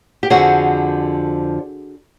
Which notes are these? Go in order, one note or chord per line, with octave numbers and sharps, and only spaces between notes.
G4
F2 D3 F3 F#4 G#4